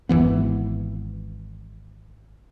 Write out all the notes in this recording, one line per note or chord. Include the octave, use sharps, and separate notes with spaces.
G#1 F#2 E3 B3